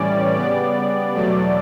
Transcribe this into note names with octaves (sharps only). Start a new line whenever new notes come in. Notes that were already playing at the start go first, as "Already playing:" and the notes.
Already playing: A2 E3 G3 C#4 D5
C#3 G3 B3 D5
E2 B2 F#3 A3